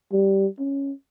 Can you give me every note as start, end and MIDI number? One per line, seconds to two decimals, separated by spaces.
0.12 0.47 55
0.59 0.92 61